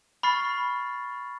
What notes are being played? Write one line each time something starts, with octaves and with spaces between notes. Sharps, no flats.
B5 C#6 F6 A6 C7